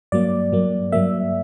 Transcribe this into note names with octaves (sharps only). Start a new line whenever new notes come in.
G2 F#3 A#3 D5
G2 F#3 A#3
G2 F#3 A#3 E5